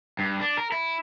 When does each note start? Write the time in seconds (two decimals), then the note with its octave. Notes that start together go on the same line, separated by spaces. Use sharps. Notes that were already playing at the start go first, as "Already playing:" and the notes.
0.19 G2
0.41 D4
0.57 A#4
0.72 E4